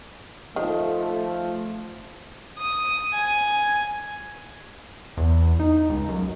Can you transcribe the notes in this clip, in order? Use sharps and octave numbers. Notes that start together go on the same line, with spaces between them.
D#3 F3 A3
D#6
G#5
E2
D#4
C#2
F#2